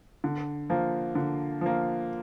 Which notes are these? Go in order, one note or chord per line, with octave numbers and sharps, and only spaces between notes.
D3
F3 A#3
D3
F3 A#3